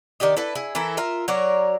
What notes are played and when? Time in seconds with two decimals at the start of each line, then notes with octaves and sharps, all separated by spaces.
0.20 D#3 D4 G4 D#5
0.37 E4 A4 B4
0.55 E4 G#4
0.75 E3 E4 A4 A#4
0.97 F4 A#4 E5
1.28 F#3 A#4 C#5 D5